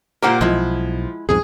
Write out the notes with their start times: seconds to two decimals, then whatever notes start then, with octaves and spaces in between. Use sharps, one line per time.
0.22 A#2 A#3 G4 A#4 C5 F#5
0.41 B1 F3 G#3 E4
1.29 B1 F2 G#2 G#4